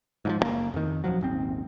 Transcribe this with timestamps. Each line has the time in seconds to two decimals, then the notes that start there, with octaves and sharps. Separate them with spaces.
0.25 G#2 E3 F3
0.39 F#1 C3 A#3
0.74 F2 D#3
1.04 D#1 F3 F#3
1.21 D#1 G#1 C4